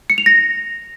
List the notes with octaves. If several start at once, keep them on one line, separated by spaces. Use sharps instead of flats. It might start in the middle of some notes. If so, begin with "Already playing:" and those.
C#7
F7
A#6